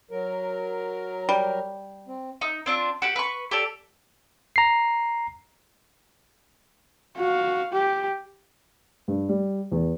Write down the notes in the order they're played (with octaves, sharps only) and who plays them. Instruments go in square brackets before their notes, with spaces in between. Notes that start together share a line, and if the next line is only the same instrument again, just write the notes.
[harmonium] F#3 A#4
[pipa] G3
[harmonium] C4
[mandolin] D#4
C4 D4 F4
F#4 G4 F#5
B4 C#6
G4 A4 D5
[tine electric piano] A#5 C7
[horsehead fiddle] F#4 F5
G4
[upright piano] G2
G3
E2